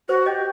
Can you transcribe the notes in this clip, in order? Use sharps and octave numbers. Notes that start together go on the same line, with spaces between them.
F#4 C5
G4 D#5